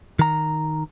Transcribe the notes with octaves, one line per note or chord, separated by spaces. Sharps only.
D#3 A#5